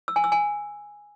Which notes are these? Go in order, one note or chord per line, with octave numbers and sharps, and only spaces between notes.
E6
G#5
E6
G#5